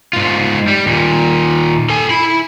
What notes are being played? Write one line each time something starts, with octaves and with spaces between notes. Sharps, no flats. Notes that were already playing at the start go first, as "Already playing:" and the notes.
G#2 F4
G3
D#2 A#2
A4 G#5
E4 B5